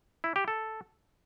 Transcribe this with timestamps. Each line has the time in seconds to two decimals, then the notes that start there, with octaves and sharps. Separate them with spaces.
0.24 E4
0.36 G4
0.48 A4